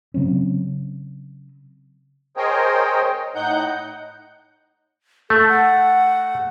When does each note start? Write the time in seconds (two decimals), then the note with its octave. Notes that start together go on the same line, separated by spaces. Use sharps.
0.14 C#3 F#3 C4 C#4
2.37 G#4 A#4 C5 C#5 D#5 G5
3.35 A2 D#4 F#5 G6
5.30 A3 A4
5.49 F#5